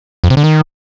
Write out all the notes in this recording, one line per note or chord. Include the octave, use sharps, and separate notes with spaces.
F2
C3
D3
D#3